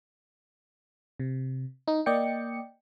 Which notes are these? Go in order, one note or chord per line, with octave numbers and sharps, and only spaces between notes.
C3
D#4
A#3 D5 D#5 G5 C#7